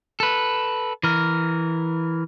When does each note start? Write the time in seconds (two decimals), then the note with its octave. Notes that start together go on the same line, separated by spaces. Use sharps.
0.20 A4 B4
1.03 E3 A#4